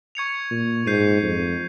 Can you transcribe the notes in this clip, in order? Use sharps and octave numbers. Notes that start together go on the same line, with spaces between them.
C#6 G#6 C#7 F7
A#2
G#2 G6 C7 D#7
F2